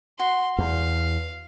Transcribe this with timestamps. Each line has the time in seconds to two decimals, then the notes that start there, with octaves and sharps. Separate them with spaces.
0.19 F#4 C6
0.58 E2 F5